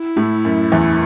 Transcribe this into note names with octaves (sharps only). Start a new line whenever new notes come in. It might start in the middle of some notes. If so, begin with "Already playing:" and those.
Already playing: E4
A2
F#2
E2